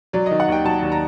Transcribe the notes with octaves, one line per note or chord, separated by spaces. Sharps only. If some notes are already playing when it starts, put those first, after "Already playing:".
F#3 D5
D#3 D#5
F#5
D#2 G5
F#3 A5
D#2
A#5